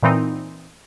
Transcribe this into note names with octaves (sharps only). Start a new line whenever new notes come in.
A#2 E3 C4 D#4